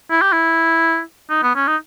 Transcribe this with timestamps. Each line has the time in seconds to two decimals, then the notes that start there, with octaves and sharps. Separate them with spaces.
0.11 E4
0.21 G4
0.33 E4
1.29 D#4
1.43 B3
1.55 C#4
1.68 D#4